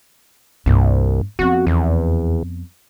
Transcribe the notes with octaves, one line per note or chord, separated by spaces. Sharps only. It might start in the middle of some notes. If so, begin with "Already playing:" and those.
C2 G2 A#3
F2 B3 F#4
E2